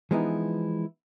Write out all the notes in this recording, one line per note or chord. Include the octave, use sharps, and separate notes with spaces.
E3 F3 G#3 B3 D#4 E4